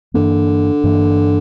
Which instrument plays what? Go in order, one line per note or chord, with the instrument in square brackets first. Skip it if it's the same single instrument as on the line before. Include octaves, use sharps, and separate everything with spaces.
[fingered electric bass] G2 E3 A#3 [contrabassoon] D3
[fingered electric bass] G2 E3 A#3